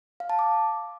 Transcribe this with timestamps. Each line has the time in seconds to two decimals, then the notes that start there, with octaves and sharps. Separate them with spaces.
0.20 F5
0.30 A5
0.39 D6